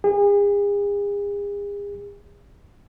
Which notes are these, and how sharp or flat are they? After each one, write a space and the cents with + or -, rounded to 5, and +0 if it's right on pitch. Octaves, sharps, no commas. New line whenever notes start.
G#4 -40